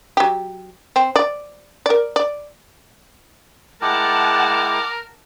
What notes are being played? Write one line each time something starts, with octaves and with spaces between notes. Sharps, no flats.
F#3 G4
C4
D5
A#4 D5
D5
G#3 E4 A#4 F#5 G5 A5 D6